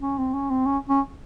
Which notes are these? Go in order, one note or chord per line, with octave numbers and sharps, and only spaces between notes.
C#4
C4
C#4
C4
C#4
C#4